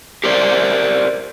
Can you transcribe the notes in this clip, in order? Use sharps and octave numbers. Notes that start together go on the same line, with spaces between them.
G4 A#4 C5 D5